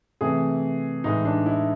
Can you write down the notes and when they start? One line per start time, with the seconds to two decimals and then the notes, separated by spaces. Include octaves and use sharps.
0.21 C3 E3 A3 G#4
1.04 A2 E3 G#3 D#4
1.25 D4
1.46 E4